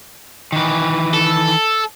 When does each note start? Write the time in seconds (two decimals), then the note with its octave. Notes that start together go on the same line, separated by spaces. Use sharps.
0.52 D#3 E3
1.14 A4